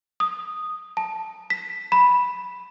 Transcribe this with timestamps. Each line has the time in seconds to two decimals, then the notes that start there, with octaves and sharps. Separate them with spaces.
0.20 D#6
0.97 A5
1.50 B6
1.92 B5